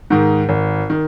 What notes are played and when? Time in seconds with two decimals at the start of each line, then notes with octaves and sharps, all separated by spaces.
0.10 G#2 D#3
0.49 G#1
0.90 D#3